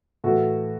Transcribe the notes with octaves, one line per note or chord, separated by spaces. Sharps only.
A2 E3 F#4 A4